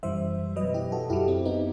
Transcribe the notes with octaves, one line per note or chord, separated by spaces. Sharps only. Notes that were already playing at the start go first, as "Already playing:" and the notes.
F#2 E3 G3 C5 E5
B2 F#3 B4 D#5
E4 G4
F#4 A4
F#2 F#3 E4 G4
C4
B3 D#4